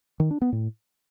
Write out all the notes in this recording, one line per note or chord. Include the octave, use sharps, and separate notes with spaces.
D#3
D4
B3
A2